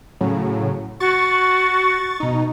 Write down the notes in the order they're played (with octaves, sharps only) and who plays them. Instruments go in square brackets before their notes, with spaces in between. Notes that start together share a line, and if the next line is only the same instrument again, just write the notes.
[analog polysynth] A2 C#3 F#3
[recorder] F#4 [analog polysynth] C#6 A6
[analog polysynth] B2 D#4